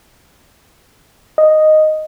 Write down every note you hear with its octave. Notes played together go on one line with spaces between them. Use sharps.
D#5